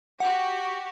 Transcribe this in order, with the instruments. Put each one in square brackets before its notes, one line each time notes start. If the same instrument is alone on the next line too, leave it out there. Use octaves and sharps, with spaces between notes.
[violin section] F#4 G4 [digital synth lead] F#5